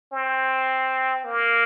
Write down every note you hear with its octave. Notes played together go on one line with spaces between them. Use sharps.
C4
A#3